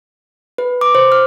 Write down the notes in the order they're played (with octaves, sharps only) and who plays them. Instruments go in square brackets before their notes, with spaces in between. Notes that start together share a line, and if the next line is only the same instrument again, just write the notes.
[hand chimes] B4
D6
C5
F6